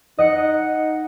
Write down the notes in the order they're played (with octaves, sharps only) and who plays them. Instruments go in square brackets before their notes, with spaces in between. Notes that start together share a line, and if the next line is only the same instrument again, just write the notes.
[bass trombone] D#4 [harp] D#5 F#5 C#7